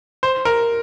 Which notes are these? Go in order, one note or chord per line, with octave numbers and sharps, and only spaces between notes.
C5
A#4